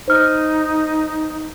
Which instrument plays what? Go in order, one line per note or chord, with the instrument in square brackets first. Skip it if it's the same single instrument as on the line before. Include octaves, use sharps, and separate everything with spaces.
[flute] D#4 [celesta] C5 F6